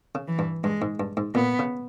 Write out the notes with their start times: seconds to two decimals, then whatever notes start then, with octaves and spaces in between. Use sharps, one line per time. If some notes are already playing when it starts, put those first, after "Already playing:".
0.15 C#3
0.28 E3
0.39 G2
0.64 G2 G#3
0.82 G#2
1.00 G2
1.17 G#2
1.35 A#2 B3
1.59 C#3